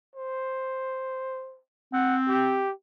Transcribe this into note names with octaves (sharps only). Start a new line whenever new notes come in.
C5
C4 F#5
G4